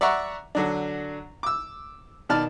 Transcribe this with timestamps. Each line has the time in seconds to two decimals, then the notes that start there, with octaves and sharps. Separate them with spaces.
0.01 D5 E5 F#5 A#5 C#6
0.55 D3 F#3 D4
1.43 D6 E6
2.29 B2 D#3 D5 A5 F6